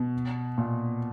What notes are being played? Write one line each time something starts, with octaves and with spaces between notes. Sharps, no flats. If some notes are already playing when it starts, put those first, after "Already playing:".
Already playing: B2
A#2